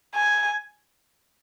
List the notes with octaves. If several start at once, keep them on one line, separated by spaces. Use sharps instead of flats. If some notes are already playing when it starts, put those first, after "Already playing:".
G#5